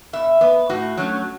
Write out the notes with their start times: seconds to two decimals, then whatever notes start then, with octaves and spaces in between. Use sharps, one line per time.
0.13 B2 E5
0.41 B3 B4
0.70 A2 F#4
0.97 F#3 A3 C#4